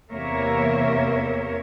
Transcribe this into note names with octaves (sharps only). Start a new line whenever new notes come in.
E2 C3 A#3 A#4 C#5 E5